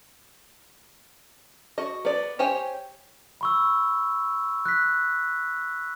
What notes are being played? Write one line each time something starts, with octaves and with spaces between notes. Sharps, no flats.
F#4 D#5
B3 D5
G4 C5 C#5 G#5
B5 C#6 E6
F#6 B6